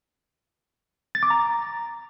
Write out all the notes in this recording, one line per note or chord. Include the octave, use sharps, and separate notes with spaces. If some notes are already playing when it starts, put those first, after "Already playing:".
A6
D6
A#5